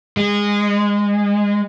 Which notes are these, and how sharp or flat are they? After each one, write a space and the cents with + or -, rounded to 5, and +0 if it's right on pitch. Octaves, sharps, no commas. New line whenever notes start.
G#3 -20